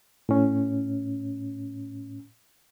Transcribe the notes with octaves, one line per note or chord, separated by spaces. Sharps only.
A2 C#4